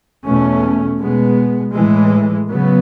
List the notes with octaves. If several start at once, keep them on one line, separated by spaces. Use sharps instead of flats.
E2 B2 A3 C#4
B2 G#3 B3
A2 E3 G#3
C#3 F#3 B3